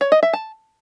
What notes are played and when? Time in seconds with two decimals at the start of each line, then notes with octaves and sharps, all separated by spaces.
0.01 C#5
0.12 D#5
0.23 E5
0.33 A5